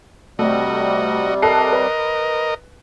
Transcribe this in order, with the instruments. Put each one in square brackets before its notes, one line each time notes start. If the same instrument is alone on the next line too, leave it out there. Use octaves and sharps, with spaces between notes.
[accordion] C3 G3 [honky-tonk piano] A3 [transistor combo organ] F#4 D#5
[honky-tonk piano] A4 F#6 C7 [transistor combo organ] A#4 D#5
[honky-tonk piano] B4